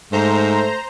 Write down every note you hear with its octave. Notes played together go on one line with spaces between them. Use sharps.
G#2 A3 C5 A#5